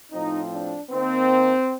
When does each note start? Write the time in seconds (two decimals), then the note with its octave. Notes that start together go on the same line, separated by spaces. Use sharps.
0.11 A2 F3 C4 D#4
0.52 D4
0.91 D#3 A#3 C4